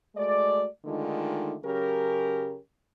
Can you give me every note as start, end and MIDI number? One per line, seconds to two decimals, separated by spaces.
0.16 0.65 56
0.16 0.65 57
0.16 0.65 66
0.16 0.65 74
0.85 1.54 50
0.85 1.54 51
0.85 1.54 56
0.85 1.54 57
0.85 1.54 63
0.85 1.54 65
1.64 2.57 49
1.64 2.57 54
1.64 2.57 61
1.64 2.57 67
1.64 2.57 70